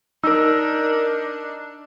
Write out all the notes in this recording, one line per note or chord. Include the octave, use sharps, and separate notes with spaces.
D4 D#4 A#4 E6